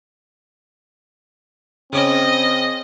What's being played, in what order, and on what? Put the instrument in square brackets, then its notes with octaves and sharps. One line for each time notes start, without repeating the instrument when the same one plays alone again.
[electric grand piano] C#3 C#4 [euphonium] C4 [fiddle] D#5